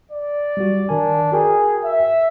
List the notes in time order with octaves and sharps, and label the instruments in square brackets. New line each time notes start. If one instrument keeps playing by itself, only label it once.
[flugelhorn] D5
[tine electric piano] G3 F#4
[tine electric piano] D#3 A#4 G#5 [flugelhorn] D4
[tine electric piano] F#4 A#4 G5 [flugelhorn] G#4
[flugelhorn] E5